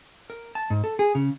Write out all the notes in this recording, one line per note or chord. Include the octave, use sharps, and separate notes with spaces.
A#4
A5
G#2
A4
G#4
C#3